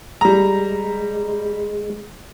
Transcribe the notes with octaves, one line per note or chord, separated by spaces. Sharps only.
G3 G#3 A#5